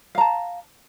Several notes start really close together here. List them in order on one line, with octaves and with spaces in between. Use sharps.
F5 A#5 A5